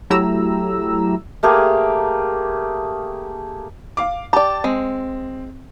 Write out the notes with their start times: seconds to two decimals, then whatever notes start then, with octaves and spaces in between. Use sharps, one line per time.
0.10 F#3 A3 E4 G4 A#5 E6
1.43 A3 A#3 G4 G#4
3.97 F5 D6
4.33 G4 D5 A5
4.64 G#3 C4